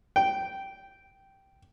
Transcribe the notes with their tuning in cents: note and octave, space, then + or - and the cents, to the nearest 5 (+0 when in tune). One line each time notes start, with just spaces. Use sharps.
G5 -10